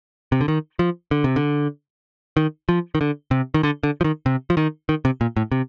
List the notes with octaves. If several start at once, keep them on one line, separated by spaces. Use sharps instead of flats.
C3
D3
D#3
F3
D3
C3
D3
D#3
F3
D#3
D3
C3
D#3
D3
D3
F3
D#3
C3
F3
D#3
D#3
C3
A#2
A2
C3